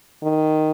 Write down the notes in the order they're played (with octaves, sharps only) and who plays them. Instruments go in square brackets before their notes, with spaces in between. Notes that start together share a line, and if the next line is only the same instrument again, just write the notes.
[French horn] D#3